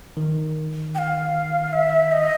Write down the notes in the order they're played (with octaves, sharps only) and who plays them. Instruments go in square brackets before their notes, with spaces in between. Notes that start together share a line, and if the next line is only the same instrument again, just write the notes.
[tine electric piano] D#3
[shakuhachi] G5
F5
E5
D#5